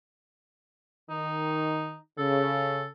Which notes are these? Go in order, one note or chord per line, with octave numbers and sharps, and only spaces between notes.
D#3 D#4
C#3 A4